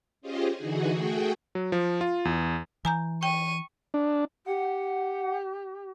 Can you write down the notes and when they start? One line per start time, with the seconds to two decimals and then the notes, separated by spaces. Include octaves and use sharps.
0.21 C#4 F4 G4 G#4 C5 D#5
0.56 D3 E3 D#4 F#4 G#4
0.93 A3 F#4 G#4 G5
1.55 F#3
1.72 F3
2.01 F4
2.25 E2
2.85 E3 G#5 A#5 G6
3.23 G5 C#6 D#7
3.94 D4
4.46 G4 F#5